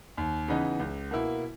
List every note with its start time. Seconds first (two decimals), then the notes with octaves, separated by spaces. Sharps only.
0.17 D#2
0.48 C#3 E3 B3 D#4
0.80 C#2
1.11 B2 A#3 E4